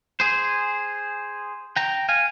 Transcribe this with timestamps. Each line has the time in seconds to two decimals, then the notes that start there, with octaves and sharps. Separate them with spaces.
0.20 G#4 C5
1.76 G5 A#5
2.09 F5 G#5